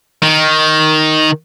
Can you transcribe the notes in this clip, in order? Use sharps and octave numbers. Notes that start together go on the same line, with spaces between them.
D#3